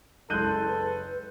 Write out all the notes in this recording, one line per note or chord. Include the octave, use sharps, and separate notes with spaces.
F#1 G#3 E4 A4 C6 F#6 G6 D#7
B4